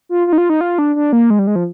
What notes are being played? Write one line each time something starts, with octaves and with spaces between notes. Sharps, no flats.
F4
F4
D#4
F4
D#4
F4
D4
D4
A#3
G#3
G3
G#3
F3